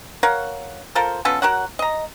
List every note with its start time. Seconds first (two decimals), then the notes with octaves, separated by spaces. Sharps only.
0.23 A#4 C#5 F5 F#5
0.95 F4 A4 A#4 C5
1.25 B3 C#4 F4 A4
1.42 F#4 A#4 C#5 F#5
1.79 D#5 A#5